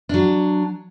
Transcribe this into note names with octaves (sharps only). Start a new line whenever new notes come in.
F#3 D4